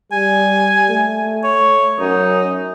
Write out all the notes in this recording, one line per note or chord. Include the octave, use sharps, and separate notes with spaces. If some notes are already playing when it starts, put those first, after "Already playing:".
G3 G#5
A3
C#5
F#2 D#4